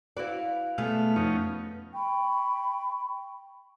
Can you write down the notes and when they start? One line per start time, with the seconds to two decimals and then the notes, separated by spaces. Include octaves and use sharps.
0.17 E4 F#4 B4 D5 F5
0.78 B2 G3 A3 G#4 F6
1.16 F2 B3 C#4 D#4
1.94 G5 B5 C#6